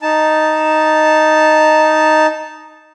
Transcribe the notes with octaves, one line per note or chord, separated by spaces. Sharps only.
D#4 A5